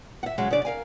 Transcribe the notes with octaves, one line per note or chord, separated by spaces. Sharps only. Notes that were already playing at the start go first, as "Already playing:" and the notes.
E5 F#5
C#3 F#3 G#3
C#3 D4 D5
A#4 F5 G#5